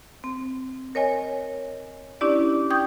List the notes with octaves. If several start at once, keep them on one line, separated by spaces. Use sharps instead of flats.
C4
A#4 C#5 D#5 G#5
C#4 D4 E4 G4 D5
G5 C#6 D#6 G6 G#6